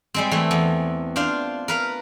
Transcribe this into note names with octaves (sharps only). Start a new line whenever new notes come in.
G3 G#3 C4
E3 A3
E2
D4 F4 C5 F5
A#4 B4 F5